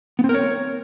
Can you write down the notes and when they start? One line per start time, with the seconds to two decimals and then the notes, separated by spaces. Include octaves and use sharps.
0.19 B3
0.24 C4
0.29 A#4
0.34 C#5